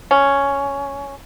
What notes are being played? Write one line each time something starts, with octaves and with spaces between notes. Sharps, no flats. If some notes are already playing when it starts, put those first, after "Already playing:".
C#4